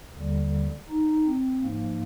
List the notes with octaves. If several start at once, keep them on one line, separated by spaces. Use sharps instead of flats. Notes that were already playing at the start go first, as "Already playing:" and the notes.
D#2 D3 G3
D#4
C4
G#2 F3 A#3